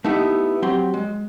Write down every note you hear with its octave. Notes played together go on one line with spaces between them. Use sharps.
A3 B3 D#4 E4 G4
F#3 C4 G4 C6
G#3